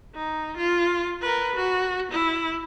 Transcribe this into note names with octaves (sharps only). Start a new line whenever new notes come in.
D#4
F4
A#4 B4
F#4
E4